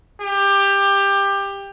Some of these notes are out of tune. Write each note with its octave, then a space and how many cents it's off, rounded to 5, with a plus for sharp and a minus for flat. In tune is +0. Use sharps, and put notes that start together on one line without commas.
G4 +20